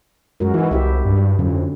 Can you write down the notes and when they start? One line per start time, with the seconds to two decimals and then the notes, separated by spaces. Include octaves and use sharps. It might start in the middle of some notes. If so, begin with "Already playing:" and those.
0.40 F#2 G#3 F#4 A#4
0.54 E3 D#4 F#4
0.71 C2 E4 G4 E5
1.05 G2
1.39 F2 D3 F#3 C#4